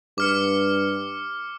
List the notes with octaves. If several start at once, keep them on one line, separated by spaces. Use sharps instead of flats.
G2 D6 F6 C#7